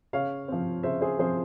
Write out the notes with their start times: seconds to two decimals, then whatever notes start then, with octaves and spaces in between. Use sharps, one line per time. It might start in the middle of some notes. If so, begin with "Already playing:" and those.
0.13 C#3 C#5 F5
0.48 F3 C4
0.83 C#3 C5 E5
1.01 G#4 C5
1.19 F3 C4 G#4 C5